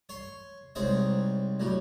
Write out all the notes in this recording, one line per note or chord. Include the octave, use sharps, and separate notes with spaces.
C#5 C6
C2 G#2 C4 G#4 C#5
A2 F#3 G3